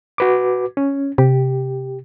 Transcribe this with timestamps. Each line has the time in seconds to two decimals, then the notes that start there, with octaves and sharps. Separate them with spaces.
0.18 F#4 B4 D6
0.77 C#4
1.18 C3 G4